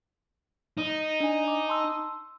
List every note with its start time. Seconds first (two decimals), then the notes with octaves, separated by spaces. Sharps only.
0.78 D#4
1.20 D4 G#5
1.44 D#5 D6
1.68 A5 C6 E6